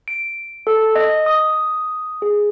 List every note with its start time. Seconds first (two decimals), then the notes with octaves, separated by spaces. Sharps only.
0.08 D7
0.67 A4
0.96 D#5
1.26 D#6
2.22 G#4